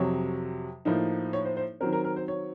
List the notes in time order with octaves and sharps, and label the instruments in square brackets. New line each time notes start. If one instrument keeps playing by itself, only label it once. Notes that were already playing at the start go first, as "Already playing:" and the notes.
Already playing: [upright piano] F2 C3 F#3 C#5
A2 F3 A#3 D#4
C#5
C5
C5
D#3 F#3 C4 A#4
A#4
A#4
C5
C#5